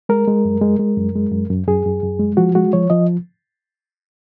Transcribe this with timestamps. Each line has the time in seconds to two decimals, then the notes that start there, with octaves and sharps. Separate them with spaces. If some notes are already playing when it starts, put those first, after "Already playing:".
0.09 G#3 A#4
0.28 G#3
0.45 F#2
0.62 G#3
0.79 G#3
0.97 F#2
1.15 G#3
1.32 F#2
1.50 F#2
1.67 F#2 G#4
1.86 F#2
2.03 F#2
2.19 G#3
2.37 F3 F#4
2.55 G#3 F#4
2.73 F3 C#5
2.90 F3 D#5